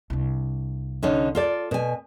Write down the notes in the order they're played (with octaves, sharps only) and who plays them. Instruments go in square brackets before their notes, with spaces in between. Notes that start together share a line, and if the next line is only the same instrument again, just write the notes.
[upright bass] C2 D4
[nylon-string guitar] D3 C#4 D#4
F4 A4 D5
B2 G#5